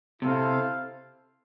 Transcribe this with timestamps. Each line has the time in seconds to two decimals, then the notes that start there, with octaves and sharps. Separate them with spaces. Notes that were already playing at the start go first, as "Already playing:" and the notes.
0.21 C3 E4 A4 C5 F5